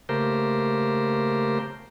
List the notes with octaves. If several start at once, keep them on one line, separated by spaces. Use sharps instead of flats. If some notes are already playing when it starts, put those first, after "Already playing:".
C#3 A3 A#3 G4 A#4 C5